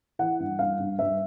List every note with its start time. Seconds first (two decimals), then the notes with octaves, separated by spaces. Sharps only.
0.19 E3 F#5
0.39 G2
0.59 G2 F5
0.79 G2
0.98 G2 E5